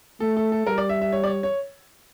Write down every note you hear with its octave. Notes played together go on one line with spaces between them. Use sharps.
A3 A4
A4
A4
G3 A#4
D5
E5
E5
C#5
D5
C#5
C#5